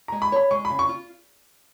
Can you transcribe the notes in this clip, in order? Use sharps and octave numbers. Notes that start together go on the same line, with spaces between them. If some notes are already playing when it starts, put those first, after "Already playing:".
G#3 A#5
B5
C#5 B5
G#3 C#6
C#3 B5
C#6
F4